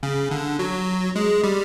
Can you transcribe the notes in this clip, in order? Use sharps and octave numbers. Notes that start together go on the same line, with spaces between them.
C#3
D3
F#3
G#3
G3